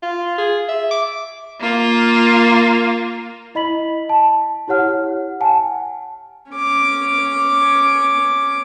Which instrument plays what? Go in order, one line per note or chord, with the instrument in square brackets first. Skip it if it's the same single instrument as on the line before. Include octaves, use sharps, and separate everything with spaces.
[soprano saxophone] F4
G#4
E5
D6
[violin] A#3 F4
[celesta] E4 D#5 B5 B6 F#7
A5
E4 G4 C#5 F#5 F6
F#5 G#5 A5
[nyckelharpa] C#4 D6